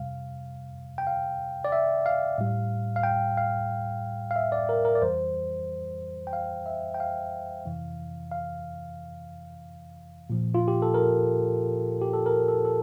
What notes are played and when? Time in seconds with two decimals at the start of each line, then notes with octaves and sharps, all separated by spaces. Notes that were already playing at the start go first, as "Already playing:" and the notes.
Already playing: F2 C3 G3 F5
0.98 G5
1.07 F5
1.65 D5
1.72 E5
2.06 F5
2.38 A2 G3
2.96 F5
3.03 G5
3.37 F5
4.31 F5
4.36 E5
4.52 D5
4.69 A#4
4.85 A#4
4.95 D5
5.02 F2 E3 G3 C5
6.27 G5
6.33 F5
6.66 E5
6.95 G5
7.00 F5
7.65 F2 C3 E3
8.31 F5
10.30 A#2 F3
10.54 F4
10.68 G4
10.82 A4
10.94 A#4
12.01 G4
12.14 A4
12.26 A#4
12.48 A4
12.65 A4